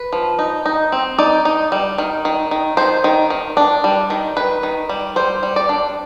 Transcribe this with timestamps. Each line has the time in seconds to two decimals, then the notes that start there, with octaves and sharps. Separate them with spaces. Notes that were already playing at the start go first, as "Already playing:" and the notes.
Already playing: B4
0.13 F3
0.39 D#4
0.66 D#4
0.92 C4
1.18 D#4 D5
1.45 D#4
1.72 G3
1.98 D#3
2.25 D#3
2.51 D#3
2.77 D#3 C5
3.04 D#3
3.30 D#3
3.57 D4
3.84 G3
4.10 D#3
4.37 D#3 B4
4.63 D#3
4.89 G3
5.16 G3 C5
5.43 G3
5.56 D5
5.69 D4